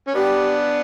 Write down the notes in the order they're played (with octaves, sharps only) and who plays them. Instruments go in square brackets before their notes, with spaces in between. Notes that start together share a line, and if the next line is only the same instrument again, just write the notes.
[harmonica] C#4
[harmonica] B3 D4 [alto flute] G4